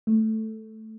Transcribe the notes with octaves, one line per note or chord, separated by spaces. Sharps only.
A3